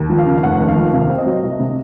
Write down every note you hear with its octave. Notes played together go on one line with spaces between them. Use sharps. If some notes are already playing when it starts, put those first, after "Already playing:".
Already playing: D#2
F3
F5
C#3
F5
F1 F#5
D#2
F5
F3
C3 F5
C4
D#5
F#3
C2
C3